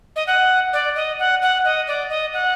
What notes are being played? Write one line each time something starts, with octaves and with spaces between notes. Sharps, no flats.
D#5
F#5
D5
D#5
F#5
F#5
D#5
D5
D#5
F#5